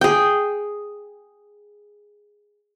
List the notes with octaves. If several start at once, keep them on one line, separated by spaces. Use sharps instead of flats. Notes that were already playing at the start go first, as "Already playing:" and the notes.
G#4 G5